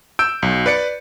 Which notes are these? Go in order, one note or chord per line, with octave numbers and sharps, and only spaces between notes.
E6 G6 D7
B1
B4 D5 C#7